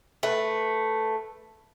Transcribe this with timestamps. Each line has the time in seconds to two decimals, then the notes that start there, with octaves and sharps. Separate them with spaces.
0.23 A3 B4